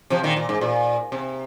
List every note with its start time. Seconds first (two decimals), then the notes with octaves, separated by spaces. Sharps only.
0.10 C3 F3
0.23 A#2 D#3
0.37 A#2
0.49 G#2
0.61 A#2
1.12 C3